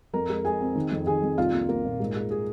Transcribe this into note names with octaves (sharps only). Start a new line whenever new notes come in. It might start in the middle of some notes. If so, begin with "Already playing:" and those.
F2 A#4 A#5
G#3
G#3 G#4 G#5
C4
D#3
F2
D#3 G#4 G#5
F2
C2 F4 F5
A#3
A#3 A#4
A#2
G#2
G#3
G#4